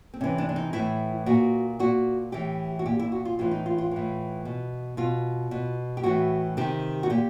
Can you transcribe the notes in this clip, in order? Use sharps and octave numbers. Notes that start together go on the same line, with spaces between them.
C4
C3 E3 C#4
D4
D4
D#4
A2 E3 E4
A#2 F#4
A#2 F#4
A2 E3 G4
F#4
A#2 G4
E4
F#4
F4
A2 E3 F4
D#4
F4
F4
A2 E3
B2
B2 F4
B2
G4
A2 E3 F#4
C3 D#3 G4
F#4
A#2 G4